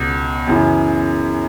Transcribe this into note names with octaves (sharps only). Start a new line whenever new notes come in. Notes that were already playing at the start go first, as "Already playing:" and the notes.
Already playing: C#2 B2
F#2 C#3 E3